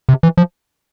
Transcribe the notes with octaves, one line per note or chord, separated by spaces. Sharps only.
C3
E3
F3